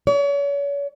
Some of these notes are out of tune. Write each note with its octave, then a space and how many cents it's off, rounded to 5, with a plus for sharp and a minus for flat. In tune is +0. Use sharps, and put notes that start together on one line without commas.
C#5 +40